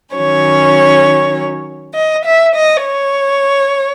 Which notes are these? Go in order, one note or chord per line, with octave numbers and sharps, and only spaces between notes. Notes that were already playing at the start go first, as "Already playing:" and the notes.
D#3 F#3 C#4 C#5
D#5
E5
D#5
C#5